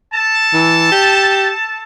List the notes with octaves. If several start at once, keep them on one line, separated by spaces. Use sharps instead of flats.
A4 A5
E3
G4